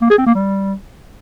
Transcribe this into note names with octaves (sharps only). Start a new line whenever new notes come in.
A#3
G#4
C4
A#3
G3